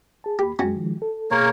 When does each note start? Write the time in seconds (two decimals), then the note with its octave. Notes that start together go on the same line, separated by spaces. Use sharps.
0.24 G#4 A5
0.39 D#2 A#3 G4 B5
0.59 F#2 G#3 C4 C#4 F#4
0.76 D#3 F3 G#3
1.02 A4
1.31 B2 A#3 G#4 A#4 C#5